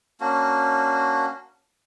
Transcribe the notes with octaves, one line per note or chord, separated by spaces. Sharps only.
A#3 C#4 D4 F#4